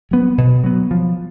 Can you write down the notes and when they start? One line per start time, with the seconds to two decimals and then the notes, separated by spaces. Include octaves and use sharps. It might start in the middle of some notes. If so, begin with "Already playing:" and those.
0.11 F#3 B3
0.38 B2
0.64 F#3 B3
0.91 F3